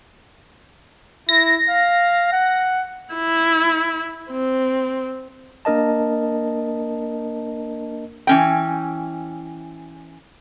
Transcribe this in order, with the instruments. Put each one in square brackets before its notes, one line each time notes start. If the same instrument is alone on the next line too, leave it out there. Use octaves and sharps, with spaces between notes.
[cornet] E4 [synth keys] A#6
[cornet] F5
F#5
[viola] E4
C4
[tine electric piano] A#3 D4 A#4 D#5 A5
[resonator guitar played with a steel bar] E3 C#4 G5